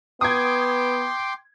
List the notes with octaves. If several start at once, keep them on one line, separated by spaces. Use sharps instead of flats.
B3 G5 C6 D6 D#6 G#6